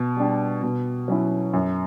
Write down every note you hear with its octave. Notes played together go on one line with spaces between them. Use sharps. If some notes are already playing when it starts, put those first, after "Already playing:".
Already playing: B2
G3 D4 G4
B2
F#3 C#4 E4
F#2